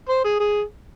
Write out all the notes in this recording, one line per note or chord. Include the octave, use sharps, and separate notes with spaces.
C5
G#4
G#4